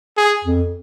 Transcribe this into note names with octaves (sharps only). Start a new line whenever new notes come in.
G#4
F2